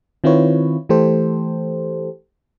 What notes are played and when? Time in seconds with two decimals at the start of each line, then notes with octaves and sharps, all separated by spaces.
0.24 D#3 C4 E4 F4 B4 C#5
0.89 E3 A3 G4 A4 C5